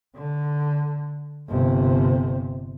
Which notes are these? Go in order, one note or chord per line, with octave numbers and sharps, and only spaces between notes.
D3
G1 C3